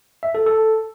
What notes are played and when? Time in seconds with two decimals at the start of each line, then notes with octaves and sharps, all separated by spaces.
0.23 E5
0.35 A4
0.46 A4